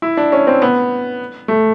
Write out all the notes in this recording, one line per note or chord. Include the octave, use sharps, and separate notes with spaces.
E4
D4
C#4
C4
B3
A3